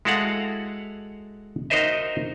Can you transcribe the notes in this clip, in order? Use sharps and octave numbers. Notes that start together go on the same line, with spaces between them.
G#3 E4 F#4 A4 F5 F#5
D#4 F#4 A#4 C5 D#5 E5